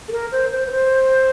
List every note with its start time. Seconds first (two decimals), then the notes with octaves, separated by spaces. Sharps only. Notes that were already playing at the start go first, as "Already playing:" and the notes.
0.08 A4
0.12 A#4
0.32 C5
0.52 C5
0.67 B4
0.72 C5